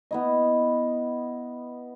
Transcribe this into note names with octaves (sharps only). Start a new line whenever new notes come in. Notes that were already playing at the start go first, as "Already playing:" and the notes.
B3 E4 D#5